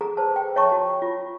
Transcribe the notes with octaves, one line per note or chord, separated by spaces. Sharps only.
G#4 A4 A#5
B4 C5 A5
G5
C#5 E5 A5 A#5 C#6
F#4 A5
F4